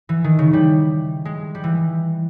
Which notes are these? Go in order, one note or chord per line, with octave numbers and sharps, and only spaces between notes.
E3
D#3
C#3
G3
G#3
G3
E3